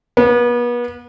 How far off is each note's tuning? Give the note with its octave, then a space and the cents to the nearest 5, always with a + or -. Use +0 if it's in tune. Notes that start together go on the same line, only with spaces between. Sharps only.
B3 -35